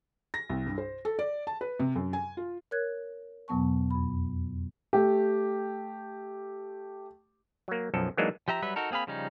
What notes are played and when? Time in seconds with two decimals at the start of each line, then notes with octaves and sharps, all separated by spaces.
0.34 A#6
0.50 C2
0.66 G2
0.78 C5
1.05 A4
1.19 D5
1.47 A5
1.61 B4
1.80 C3
1.96 F#2
2.13 G#5
2.37 F4
2.71 A#4 C#5 F#6 G#6
3.48 E2 B2 F#3 B3 A5 C#6
3.91 F2 B5
4.93 A3 G4
7.68 F#3 A#3
7.94 B1 F#2 F3 A4
8.17 E3 F#3 G#3 A#3 D4 D#4
8.48 F3 G4 E5 A#5
8.62 F#3 G3 B4 E5
8.76 D#4 F#4 A4 A#4
8.91 A#3 C4 G#4 F5 B5
9.07 C#3 F3 G3 C#4 D#4